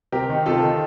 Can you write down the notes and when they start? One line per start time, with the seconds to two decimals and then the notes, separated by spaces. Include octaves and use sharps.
0.12 C3 G4 A#4
0.29 D#3
0.46 C3 F4 A4
0.63 D#3